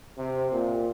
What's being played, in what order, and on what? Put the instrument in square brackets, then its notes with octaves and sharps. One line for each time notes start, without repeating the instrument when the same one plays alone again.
[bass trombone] C3
A#2